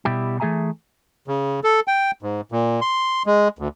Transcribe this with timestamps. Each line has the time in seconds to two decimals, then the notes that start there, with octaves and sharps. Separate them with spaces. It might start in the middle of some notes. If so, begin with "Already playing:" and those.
0.05 B2 G3 E4 G4
0.40 E3 A3 G#4 E5 G#5 A#5
1.28 C#3
1.64 A4
1.88 G5
2.23 G#2
2.52 A#2
2.81 C6
3.26 G#3
3.59 D2